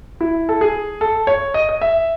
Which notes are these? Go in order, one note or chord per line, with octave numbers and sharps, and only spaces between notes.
E4
A4
G#4
A4
C#5
D#5
D#5
E5